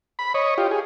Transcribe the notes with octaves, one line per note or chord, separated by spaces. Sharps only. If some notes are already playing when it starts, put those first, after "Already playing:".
B5
C#5 D#5
F4 G4
G#4